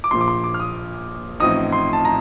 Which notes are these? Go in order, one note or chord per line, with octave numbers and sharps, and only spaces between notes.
D6
A#1 A#2 F3 C6
D6
C6
D6
F6
D#6
A1 A2 F3 C4 D#4 D#6
C6
A5
A#5